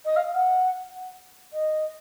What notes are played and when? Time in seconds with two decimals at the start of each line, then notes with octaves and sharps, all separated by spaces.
0.05 D#5
0.16 F5
0.34 F#5
1.53 D#5